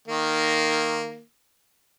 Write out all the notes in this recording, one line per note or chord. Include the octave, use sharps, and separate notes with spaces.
D#3 A#3